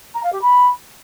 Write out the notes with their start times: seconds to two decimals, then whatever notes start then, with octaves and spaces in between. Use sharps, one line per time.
0.14 A#5
0.23 F5
0.32 G4
0.41 B5